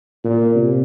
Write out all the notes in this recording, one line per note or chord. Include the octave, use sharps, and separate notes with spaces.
A#2
C3